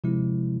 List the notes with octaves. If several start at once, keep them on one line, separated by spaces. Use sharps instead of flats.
C3 F3 G#3 E4